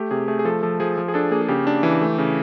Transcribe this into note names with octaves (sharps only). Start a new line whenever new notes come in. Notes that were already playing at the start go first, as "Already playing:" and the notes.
Already playing: A3 G4
C3 G#4
A3 G#4
G#4
F3 A4
F3 A4
F3 G#4
F3
G#4
D4 A4
A#3 G#4
G#4
C#3 G4
D4
E3
A3
C#3